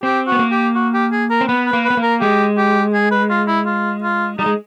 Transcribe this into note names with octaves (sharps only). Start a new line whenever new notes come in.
C4 G4
B3 F#4
A#3
G4
F#4
G4
G#4
A#4
C4
B3 B4
B4
A#3
B4
B3
A#3
A#4
G#3 G4
G4
G#4
B4
F4
E4
F4
F4
G3 D#4
G#3